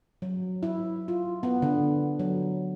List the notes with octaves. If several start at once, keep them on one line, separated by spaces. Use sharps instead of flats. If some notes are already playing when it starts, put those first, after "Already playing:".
F#3
E4
F4
B3
D3
F#3